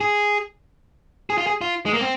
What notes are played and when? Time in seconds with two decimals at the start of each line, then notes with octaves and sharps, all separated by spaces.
0.01 G#4
1.30 G#4
1.38 F4
1.47 G#4
1.61 F4
1.86 G#3
1.93 A#3
2.01 C4